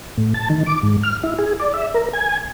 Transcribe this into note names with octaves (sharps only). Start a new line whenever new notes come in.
A2
A5
D#3
D6
G#2
F6
E4
G#4
D5
E5
A#4
G#5